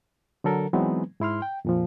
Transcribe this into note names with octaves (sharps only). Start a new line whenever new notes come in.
D3 F#3 A4 A#4
E3 F#3 G#3 B3 C4 D#4
G#2 E4 C6 F6
G5
F2 A#2 F3